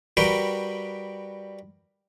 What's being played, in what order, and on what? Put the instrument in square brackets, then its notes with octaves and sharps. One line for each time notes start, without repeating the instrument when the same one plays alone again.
[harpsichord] G3 F#4 A#4 B4 G5